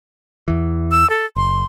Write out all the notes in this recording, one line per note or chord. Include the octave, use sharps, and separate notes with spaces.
E2 E3
E6
A4
F#1 C6